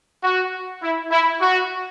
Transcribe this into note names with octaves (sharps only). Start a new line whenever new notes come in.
F#4
E4
E4
F#4